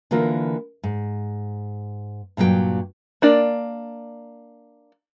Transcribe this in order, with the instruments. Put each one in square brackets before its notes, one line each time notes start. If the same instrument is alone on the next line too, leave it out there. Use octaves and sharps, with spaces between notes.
[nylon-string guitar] D3 E3 A#3 F4 A#4
G#2
G2 A#2 F#3 G#4 G5
[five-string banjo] A#3 D4 D5